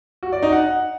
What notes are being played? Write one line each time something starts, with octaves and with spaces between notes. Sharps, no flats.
F#4
D5
D#4
F#5